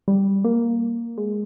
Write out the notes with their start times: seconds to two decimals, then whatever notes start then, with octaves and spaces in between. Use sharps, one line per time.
0.08 G3
0.45 A#3
1.18 G#3